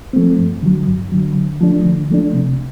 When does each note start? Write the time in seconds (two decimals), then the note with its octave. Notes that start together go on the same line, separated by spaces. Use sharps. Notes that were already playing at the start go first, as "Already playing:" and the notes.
0.13 F3 A3 C4
0.38 G2
0.63 D3 F#3
0.87 G2
1.12 D3 F#3
1.36 D3
1.61 F3 A3 D4
1.85 D3
2.10 F3 A3 D4
2.34 C3